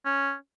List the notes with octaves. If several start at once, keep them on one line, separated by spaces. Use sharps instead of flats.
C#4